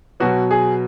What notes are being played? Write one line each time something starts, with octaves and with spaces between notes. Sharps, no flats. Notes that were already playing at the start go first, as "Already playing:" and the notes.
B2 F#3 B3 F#4
G#4